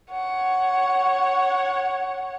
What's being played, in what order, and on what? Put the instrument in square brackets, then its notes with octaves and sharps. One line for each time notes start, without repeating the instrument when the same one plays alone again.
[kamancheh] C#5 F#5